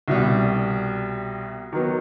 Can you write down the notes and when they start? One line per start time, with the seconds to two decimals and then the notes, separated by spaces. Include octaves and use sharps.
0.08 C2 B2 G3
1.73 D#3 F#3 B3